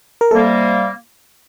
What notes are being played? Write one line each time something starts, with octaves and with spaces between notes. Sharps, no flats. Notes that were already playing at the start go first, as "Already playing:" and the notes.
A#4
C3 G3 A#3 A4